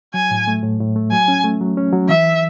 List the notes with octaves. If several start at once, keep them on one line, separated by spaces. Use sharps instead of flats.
F#3 G#5
A2
A3
A2
A2
A3
F#3 G#5
C#4
A3
F#3
C#4
F#3
E3 E5